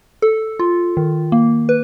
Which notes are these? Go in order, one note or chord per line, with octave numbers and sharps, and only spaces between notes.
A4
F4
D#3
A#3
B4